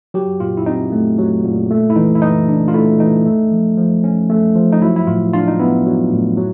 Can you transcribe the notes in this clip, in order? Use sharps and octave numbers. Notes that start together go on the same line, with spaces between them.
F#3 G4
A#2 F4
E4
C4 D#4
A3
F#3
A#2
A3
E4
E3 D#4
E4
E3 D#4
D4
F4
A3 E4
E3 D#4
A3
F3
F3
C#4
A3
F3
D#4
F#3 E4
E4
A2 F4
D4 F4
D#4
B3 E4
F#3
A2
F#3